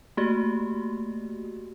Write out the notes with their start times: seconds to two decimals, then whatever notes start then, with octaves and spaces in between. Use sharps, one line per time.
0.17 A3 A#3 F#4 G4